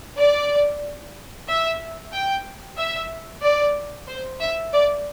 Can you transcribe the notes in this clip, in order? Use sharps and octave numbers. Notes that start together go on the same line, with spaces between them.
D5
E5
G5
E5
D5
C5
E5
D5